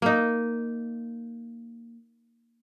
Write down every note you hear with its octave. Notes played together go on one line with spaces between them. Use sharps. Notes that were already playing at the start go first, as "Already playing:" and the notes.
A#3 D#4